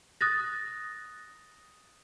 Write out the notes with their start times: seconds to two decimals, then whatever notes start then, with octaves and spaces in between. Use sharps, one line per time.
0.21 D#6 F#6 A6 A#6